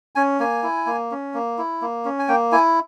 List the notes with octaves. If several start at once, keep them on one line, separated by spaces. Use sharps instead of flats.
C#4 G#5
A#3 G#5
E4
A#3
C#4
A#3
E4
A#3
C#4
G#5
A#3 G5
E4 G#5